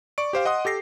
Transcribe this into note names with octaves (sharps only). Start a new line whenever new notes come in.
D5 C#6 D7
G4 C5 F5
D#5 F#5 C6 D#6
G4 A4 A#6 C7